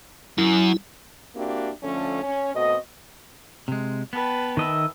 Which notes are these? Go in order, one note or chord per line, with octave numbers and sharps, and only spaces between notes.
F#2 E4
A#3 C4 D4 E4 F#4 G4
D3 F3 A3 C#4
C#4
B2 A3 C4 F#4 D#5
C3 G#3
B3 B4 G5 A5
D#3 D#5 E5